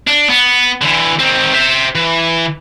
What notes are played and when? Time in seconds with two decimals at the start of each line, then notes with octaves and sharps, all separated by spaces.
0.07 D4
0.30 B3
0.82 D3 E3
1.19 D#3 C4
1.54 C5 E5
1.95 E3